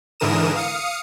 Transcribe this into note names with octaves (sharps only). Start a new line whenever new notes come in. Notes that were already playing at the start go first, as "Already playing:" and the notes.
G#2 D3 E3 A#4 D#6 E7
F5 D#6 C#7